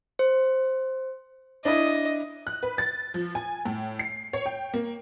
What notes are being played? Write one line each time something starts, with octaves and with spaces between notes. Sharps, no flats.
C5
D4 E4 D#5
F#6
B4
A6
F3
G#5
A2
C7
C#5
G5
A#3